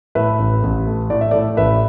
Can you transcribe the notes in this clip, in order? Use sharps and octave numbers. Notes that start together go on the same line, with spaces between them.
A2 B4 E5
A1
A1
A3
A2 D5
E5
A2 A4 D5
A1 B4 E5